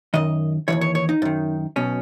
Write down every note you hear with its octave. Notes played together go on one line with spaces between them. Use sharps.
F#2 D#3 D#5
D#2 C#3 E3 C#5
C#5
C#5
D#4
F#2 D#3
B1 B2 C#4